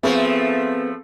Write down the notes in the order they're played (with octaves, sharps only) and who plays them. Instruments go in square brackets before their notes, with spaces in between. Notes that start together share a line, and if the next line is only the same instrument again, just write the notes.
[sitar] F3 A3 [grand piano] B3 C4 G#4